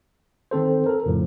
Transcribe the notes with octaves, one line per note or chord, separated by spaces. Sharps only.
D#3 C4 A4 C5
A4 A#4
F2 A2 C#3 F3